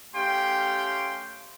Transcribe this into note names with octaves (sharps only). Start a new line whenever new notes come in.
A3 C#4 G4 F5 G5 C6